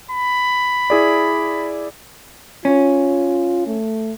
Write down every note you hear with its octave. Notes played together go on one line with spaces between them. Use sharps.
B5
E4 G#4 D5
C#4 F4
A3